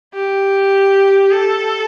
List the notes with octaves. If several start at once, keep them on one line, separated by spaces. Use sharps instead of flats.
G4
A4